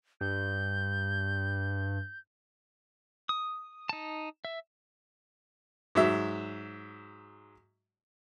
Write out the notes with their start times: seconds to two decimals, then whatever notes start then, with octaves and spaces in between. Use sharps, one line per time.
0.21 G2 G6
3.29 D#6
3.89 D#4 A5
4.45 E5
5.95 G#2 F#3 E5